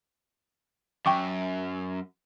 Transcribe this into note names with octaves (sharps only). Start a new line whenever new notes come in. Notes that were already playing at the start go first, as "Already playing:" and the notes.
F#2 G5 C#6 D6